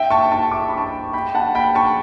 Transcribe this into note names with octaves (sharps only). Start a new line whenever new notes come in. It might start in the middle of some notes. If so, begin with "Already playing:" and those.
Already playing: E5 G5
A5 C#6
A5 C#6
D6
C#6
B5
A5 C#6
G5 B5
F#5 A5
G5 B5
A5 C#6